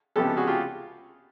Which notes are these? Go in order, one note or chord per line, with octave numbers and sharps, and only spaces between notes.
C#2 C3 F3 G#3 B3 G4 A4
F#4 G#4
F4 G4